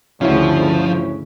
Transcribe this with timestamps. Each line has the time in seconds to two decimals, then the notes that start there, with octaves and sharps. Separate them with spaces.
0.21 D2 G2 C#3 F3 C#4 E4 F#4